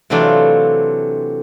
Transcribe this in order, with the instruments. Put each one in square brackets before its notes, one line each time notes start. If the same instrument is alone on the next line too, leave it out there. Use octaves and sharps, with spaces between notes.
[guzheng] C3 E3 F#3 A3 D4 F4